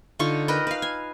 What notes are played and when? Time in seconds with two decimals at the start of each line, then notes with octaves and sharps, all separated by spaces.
0.19 D3 D#4 F4 C#6
0.48 A#4 B4 D#5 G5
0.67 B4 F5
0.82 G#5